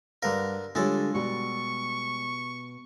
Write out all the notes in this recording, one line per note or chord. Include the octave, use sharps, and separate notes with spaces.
G2 D3 A#4 B4 F5
D3 G3 G#3 F4 A4 C#5
B2 G3 C#6